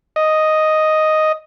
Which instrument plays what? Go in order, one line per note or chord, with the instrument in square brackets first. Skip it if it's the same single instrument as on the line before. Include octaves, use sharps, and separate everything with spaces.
[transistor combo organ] D#5